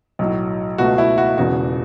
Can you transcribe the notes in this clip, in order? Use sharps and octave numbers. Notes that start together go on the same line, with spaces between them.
B1 A2 F#3
C#2 B2 A3 F#4
E4
F#4
E1 E2 C#3 F#4